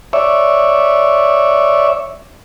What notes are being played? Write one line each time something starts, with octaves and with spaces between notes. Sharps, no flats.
C#5 D5 E5